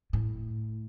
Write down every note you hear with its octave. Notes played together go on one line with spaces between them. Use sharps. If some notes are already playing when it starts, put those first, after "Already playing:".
A2